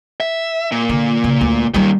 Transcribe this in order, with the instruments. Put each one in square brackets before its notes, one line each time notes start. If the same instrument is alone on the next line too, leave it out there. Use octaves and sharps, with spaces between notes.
[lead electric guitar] E5
A#2
[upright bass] D3
C#3
D2
[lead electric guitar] A#2 D#3 [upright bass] G3 D#4